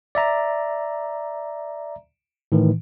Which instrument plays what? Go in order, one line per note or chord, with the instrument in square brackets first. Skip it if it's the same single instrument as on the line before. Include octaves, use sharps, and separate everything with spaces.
[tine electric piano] D5 E5 A#5
A2 D#3 E3